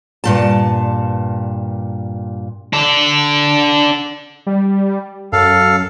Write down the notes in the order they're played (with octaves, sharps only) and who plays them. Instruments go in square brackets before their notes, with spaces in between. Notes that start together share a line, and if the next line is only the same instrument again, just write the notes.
[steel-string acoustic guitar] G2 A#2 A5
[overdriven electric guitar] D4 A4
[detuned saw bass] G3
[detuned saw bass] F#2 [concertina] A4 F5